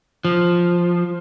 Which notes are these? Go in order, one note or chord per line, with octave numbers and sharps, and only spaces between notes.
F3